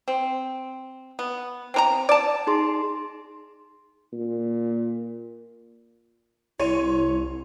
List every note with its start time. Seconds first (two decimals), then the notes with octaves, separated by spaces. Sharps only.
0.08 C4
1.19 B3
1.74 C4 A#4 A#5
2.09 D5 A5
2.47 D#4 G#4 C6
4.13 A#2
6.60 C2 E4 C#5 C6 D#7